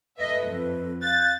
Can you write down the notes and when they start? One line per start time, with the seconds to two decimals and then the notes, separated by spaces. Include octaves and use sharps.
0.18 A4 B4 D#5 E5
0.46 F2
1.02 F5 F#6 G6 A6